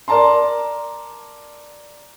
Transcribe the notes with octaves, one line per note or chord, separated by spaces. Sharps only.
A#4 D5 A5 A#5 C6